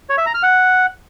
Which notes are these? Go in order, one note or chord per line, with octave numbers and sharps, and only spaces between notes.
C#5
E5
A#5
F6
F#5